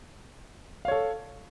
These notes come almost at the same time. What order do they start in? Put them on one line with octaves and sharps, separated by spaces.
F5 C#5 A4